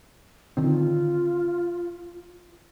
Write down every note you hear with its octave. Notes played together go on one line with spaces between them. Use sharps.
D3 D#3 C4 F4